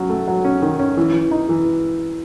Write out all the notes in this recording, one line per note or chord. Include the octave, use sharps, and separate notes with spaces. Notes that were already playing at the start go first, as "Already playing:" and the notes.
Already playing: F#3 C#4
A3
F#3
C#4
D#3
C#4
E3
E3
D#4
E3